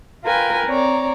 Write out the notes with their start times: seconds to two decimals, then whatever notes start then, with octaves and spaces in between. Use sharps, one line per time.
0.25 F4 A#4 B4 G5 G#5
0.67 C4 C#5 D5 A#5